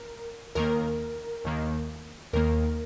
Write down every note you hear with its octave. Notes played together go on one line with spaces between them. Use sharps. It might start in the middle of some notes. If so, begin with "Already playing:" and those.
Already playing: A#4
D#2 D#3 A#3 A#4
D#2 D#3 A#3
D#2 D#3 A#3 A#4